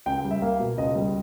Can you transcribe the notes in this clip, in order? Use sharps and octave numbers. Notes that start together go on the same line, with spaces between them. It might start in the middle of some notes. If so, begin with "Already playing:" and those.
C#2 G5
G3
E5
A#3 F5
B2
C#2 D#5
G3